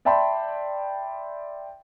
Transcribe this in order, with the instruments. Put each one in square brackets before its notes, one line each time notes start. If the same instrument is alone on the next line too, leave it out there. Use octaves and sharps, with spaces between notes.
[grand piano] D5 E5 G5 A5 B5 C6